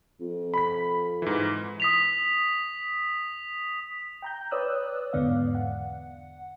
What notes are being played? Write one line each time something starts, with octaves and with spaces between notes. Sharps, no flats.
F2
B5 B6
G#2 E3
D#6 B6 F7
G5 A#5 G6
B4 C#5 D5 D#6 E6 F#6
E2 G#2 D3 B3 D5 F5
F#5